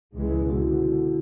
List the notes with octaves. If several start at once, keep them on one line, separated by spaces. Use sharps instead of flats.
C#2 E3 G#3
B2 D3 E4 F#4